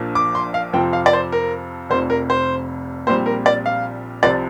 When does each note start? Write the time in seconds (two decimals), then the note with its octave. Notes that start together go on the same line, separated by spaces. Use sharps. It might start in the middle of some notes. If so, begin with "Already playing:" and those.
Already playing: A#1 A#2 F3 A#3 D4
0.15 D6
0.35 C6
0.54 F5
0.73 F2 C3 F3 C4 G5
0.93 F5
1.06 D5
1.13 C5
1.32 A#4
1.90 F1 F2 C3 C5
2.10 A#4
2.30 C5
3.07 A#1 A#2 G3 C4 C5
3.26 A#4
3.46 D5
3.66 F5
4.23 C2 C3 F3 C4 D5